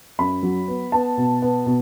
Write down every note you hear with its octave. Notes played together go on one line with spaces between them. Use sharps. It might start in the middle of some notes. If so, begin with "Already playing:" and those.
F#2 B5
F#3
B3
B3 A5
B2
B3
B2